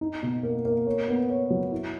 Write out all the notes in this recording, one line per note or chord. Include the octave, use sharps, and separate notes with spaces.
D#4
B2
A#3
A#3
C#5
B3
C#5
F#3
E4